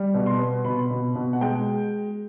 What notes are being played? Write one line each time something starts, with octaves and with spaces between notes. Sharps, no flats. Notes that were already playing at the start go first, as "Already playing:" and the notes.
Already playing: G3
B2
C6
B3
B2 B5
B2
B2
F#5
G#3 G5